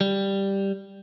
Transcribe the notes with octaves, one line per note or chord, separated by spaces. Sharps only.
G3